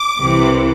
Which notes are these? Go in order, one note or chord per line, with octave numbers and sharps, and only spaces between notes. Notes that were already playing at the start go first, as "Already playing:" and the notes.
Already playing: D6
C2 C3 E3